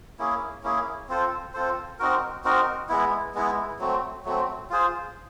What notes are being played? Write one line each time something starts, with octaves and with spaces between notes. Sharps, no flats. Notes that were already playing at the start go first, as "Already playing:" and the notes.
A#3 C#4 E4 G#4
A#3 C#4 E4 G#4
C4 F4 A4 C5
C4 F4 A4 C5
C4 D#4 F#4 A#4
C4 D#4 F#4 A#4
G#3 B3 E4
G#3 B3 E4
F#3 A3 C4
F#3 A3 C4
F4 G#4 C5